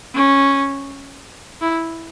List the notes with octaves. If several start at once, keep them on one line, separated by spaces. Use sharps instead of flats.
C#4
E4